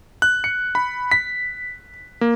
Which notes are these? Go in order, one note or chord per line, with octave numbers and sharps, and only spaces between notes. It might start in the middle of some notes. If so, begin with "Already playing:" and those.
F#6
C#7
B5
B6
A#3